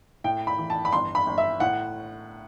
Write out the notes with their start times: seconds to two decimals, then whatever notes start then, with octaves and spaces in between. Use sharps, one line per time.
0.24 A2 G5
0.47 B5
0.58 E3
0.70 A5
0.85 B5
0.92 G1 C6
1.15 B5
1.27 G1
1.38 E5
1.60 A2 F#5